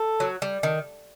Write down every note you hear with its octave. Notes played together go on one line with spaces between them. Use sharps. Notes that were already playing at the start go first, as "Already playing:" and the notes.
Already playing: A4
F#3
G3
D#3